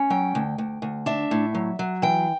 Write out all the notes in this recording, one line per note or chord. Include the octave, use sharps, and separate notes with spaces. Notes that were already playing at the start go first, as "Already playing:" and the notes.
Already playing: C#4
F#3 G5
D2
D2
D2
D4 E5
A2
F#3
F#3
E3 G5